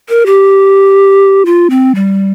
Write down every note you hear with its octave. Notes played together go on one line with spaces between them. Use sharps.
A#4
G4
F4
C4
G3